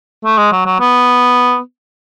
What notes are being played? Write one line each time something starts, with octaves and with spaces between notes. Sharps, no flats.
A3
G#3
F#3
F#3
B3